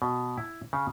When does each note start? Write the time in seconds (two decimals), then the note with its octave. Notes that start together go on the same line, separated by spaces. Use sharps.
0.02 B2
0.37 E4
0.73 C#3